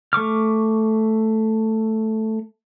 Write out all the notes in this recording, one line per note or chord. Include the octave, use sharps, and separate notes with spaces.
A3 C#6 D6 F6